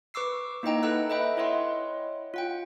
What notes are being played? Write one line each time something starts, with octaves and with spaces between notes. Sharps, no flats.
B4 C#6 D6 E6 C7
A#3 D#4 E4 D#5 G5 A#5
A4 B4 F#5 E6 F#6
B4 D#5 E5 G5 B5
E4 C#5 D#5 F#5 C6
F4 F#5 G5